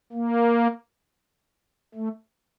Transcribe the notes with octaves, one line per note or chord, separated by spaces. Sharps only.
A#3
A3